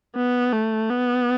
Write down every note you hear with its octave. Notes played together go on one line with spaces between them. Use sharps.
B3
A3
B3